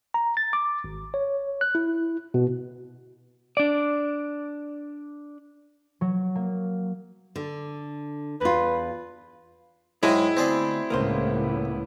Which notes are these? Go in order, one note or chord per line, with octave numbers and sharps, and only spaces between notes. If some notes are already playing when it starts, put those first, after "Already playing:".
A#5
A6
D6
G#1
C#5
F#6
E4
B2
D4 D5
F#3
A#3
D3
E2 F4 B4
G#2 F#3 G#3 E4 G#4 D#5 G5
D2 G#2 B2 C4 G#4 D5
C#2 A2 A#3 B3 C5